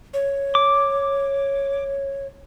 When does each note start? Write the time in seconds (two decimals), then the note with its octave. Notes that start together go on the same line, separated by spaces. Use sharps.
0.14 C#5
0.55 D6